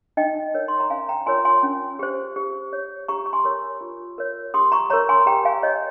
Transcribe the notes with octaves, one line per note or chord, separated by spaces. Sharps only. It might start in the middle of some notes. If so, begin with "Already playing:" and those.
D#4 D#5 G5
A#4 C#5
C6
A#5
C#4 F5 G#5
G5 A#5
F4 A#4 C#5 G#5 C6
G#5 C6
C#4
G4 C5
G4
C#5
G4 A#5 C#6
C#6
G#5 C6
A#4 C#5
F4
A#4 C#5
G4 C6 D#6
A#5 C#6
A#4 C#5 A#5 C#6
G#5 C6
G4 G5 A#5
F5 G#5
C#5 D#5